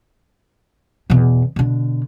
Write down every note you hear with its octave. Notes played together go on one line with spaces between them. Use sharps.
E2 B2
B2 D3